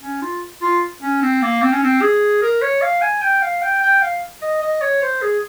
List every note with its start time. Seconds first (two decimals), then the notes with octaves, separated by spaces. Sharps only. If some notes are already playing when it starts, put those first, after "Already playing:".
0.02 C#4
0.22 F4
0.62 F4
1.02 C#4
1.22 C4
1.42 A#3
1.62 C4
1.73 C#4
1.83 C4
2.02 G#4
2.42 A#4
2.62 C#5
2.82 F5
3.01 G#5
3.22 G5
3.42 F5
3.62 G5
3.82 G5
4.02 F5
4.42 D#5
4.62 D#5
4.81 C#5
5.02 C5
5.22 G#4